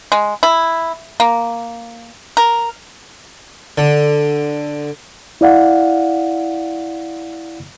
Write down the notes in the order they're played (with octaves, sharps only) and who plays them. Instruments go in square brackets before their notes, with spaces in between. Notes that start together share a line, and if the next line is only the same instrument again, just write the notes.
[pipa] G#3
E4
A#3
A#4
[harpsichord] D3
[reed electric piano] E4 D5 F5 F#5